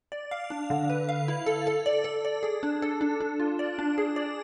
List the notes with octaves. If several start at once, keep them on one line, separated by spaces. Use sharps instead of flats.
D5
F5
D4
D3
B4
F5
E4
A4
A4
D5
A4
D5
G#4
D4
A4
D4
D4
F4
D5
D4
G#4
D5